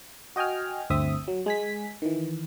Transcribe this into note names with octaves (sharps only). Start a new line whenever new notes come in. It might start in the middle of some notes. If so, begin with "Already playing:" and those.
F#4 D#5 G5 G#5 F6
G1 D2 C4 E5 D#6
F#3
G#3 G#5 B6
D#3 E3